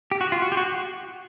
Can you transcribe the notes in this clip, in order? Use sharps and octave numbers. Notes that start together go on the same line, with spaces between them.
G4
F#4
F4
F#4
G4
F#4